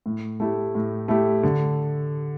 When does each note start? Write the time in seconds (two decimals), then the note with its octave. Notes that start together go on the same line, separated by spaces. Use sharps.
0.06 A2
0.40 A3 E4 G4
0.75 A2
1.08 A3 E4 G4
1.43 D3